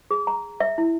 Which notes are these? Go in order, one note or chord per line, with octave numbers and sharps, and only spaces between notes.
G#4
A#5
E5
E4